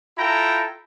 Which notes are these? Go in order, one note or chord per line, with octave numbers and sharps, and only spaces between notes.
E4 F4 A4 G5 A#5